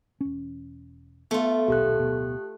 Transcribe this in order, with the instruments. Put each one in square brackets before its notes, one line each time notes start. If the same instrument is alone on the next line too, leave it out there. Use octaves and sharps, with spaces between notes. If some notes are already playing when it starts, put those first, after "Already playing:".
[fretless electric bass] E1 C#4
[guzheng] A3 F4 [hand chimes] B3
[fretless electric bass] D#1 B1 [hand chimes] G4 A4 F#6
[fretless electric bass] D1 B2